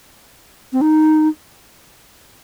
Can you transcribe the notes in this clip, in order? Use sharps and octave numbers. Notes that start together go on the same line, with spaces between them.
C4
D#4